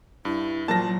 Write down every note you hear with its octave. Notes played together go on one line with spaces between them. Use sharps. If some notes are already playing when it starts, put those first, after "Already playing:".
G2 E4
A#2 F3 F#3 A5 A#6